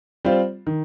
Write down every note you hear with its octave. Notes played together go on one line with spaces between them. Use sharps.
G3 C4 F4 C5
D#3